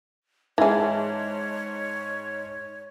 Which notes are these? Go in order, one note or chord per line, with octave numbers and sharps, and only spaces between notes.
G#2 E3 G#4 C#5 A5 G#6